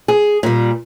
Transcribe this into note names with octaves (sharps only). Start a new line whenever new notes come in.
G#4
A#2 G3